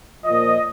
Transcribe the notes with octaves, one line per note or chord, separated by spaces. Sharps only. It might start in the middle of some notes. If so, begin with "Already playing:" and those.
A#2 F3 D#5